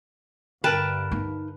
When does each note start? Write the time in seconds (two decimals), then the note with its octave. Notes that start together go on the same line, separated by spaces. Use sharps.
0.64 G2 D3 A#4 B4 G5 A5
1.11 D#4